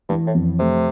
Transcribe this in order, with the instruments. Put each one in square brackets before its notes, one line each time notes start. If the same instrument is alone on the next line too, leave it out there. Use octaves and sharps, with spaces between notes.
[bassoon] G2 [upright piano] E3
[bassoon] A2
[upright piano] F2
[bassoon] C3 [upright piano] A3